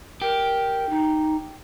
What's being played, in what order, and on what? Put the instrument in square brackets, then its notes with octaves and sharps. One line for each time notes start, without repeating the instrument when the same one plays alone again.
[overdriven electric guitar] G4 [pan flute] A#4
[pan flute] D#4